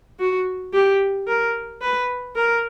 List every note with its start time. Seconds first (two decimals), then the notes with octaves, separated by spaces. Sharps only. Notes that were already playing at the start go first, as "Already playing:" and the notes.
0.19 F#4
0.73 G4
1.27 A#4
1.81 B4
2.35 A#4